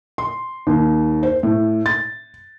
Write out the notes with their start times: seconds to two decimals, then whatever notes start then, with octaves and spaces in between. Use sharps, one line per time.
0.18 C6
0.67 D#2
1.23 C5
1.43 A2
1.86 A6